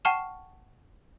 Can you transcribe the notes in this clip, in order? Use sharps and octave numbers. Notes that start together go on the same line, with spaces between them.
F#5 G5 A5 C#6 F6 E7